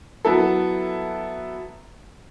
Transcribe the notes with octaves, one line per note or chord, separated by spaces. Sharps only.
F#3 B3 E4 A4